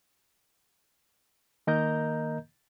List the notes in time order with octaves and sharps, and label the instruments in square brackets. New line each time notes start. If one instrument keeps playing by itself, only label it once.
[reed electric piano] D#3 A#3 A#4 D#5 A#5 G6